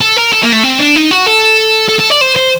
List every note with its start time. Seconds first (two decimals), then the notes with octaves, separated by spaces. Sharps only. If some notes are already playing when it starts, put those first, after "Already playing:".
0.01 A4
0.17 A#4
0.32 A4
0.43 A#3
0.53 A3
0.64 C4
0.79 D4
0.96 D#4
1.11 F#4
1.26 A4
1.89 A4
1.99 A4
2.10 D5
2.21 C5
2.36 C5